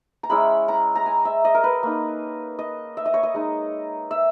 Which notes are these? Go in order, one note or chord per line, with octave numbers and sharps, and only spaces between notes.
A#5
G#3 C#4 E4 B5
A#5
A#5
G#5
E5
D#5
A#4
B4
A#3 D#4
D#5
E5
D#5
C#5
D#5
G#3 D#4
E5